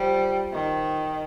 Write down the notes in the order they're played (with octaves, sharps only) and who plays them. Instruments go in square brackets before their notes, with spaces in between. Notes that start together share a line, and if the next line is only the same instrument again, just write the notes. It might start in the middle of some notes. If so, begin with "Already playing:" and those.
Already playing: [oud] F3 [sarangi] G3
[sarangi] D#3